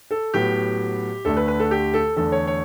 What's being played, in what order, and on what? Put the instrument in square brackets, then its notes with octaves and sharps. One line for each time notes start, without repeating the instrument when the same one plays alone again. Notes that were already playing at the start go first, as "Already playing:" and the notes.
[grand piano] A4
A2 F#3 B3 G4
D2 D3 A3 A4
B4
B4
A4
G4
A4
E2 D3 A3 A4
C#5
C#5